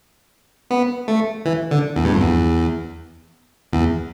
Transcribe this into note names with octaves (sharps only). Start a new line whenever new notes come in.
B3
A3
E3
D3
E2
G2
F2
E2
E2